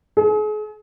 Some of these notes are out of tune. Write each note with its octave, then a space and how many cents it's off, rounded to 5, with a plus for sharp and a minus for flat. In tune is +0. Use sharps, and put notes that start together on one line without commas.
G#4 +40